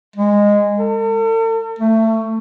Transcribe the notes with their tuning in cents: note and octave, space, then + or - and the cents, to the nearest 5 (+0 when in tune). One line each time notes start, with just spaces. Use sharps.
G#3 -15
A4 +45
A3 +20